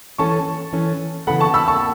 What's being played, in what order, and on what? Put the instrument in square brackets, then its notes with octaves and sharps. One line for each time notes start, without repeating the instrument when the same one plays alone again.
[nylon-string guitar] E3 C#4 A4 [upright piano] A5 C#6
[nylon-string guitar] E3 C#4 A4
[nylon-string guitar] C#3 E3 B3 A4 [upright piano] F#5 B5
[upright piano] A5 C#6
B5 E6
A5 C#6